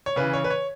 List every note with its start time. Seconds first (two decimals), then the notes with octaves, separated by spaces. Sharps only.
0.06 C#5
0.16 C#3 E3 B4
0.34 C#5
0.44 B4
0.50 C#5